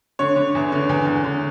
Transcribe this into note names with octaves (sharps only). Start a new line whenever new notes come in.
D3 C#5
D3
E2
D3
E2
E2
D3